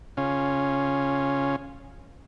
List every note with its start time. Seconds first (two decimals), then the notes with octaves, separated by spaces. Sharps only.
0.17 C#3 C#4 F4